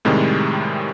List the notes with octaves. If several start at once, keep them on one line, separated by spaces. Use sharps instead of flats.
A2 C3 D#3 G3 G#3